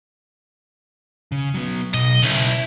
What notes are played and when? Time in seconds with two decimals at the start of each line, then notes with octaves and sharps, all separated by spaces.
1.32 C#3
1.54 F#3 B3
1.94 B1 D#5
2.23 B1 C#3 E4
2.48 E4